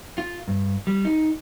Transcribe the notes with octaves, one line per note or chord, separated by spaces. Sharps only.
F4
G2
G3
D#4